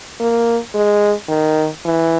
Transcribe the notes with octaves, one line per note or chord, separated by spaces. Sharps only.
A#3
G#3
D#3
E3